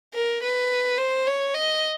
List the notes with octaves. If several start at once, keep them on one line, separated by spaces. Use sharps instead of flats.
A#4
B4
C5
C#5
D#5